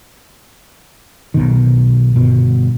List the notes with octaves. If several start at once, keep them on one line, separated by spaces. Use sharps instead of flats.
B1 B2 D#3
G1 B2